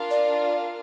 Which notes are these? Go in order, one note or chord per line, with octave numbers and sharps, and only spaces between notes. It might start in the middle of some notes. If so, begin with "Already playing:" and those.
Already playing: D4 F4 A#4 F5
D5